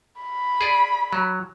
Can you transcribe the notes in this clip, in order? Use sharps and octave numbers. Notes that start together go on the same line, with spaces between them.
B5
G#4 D5
F#3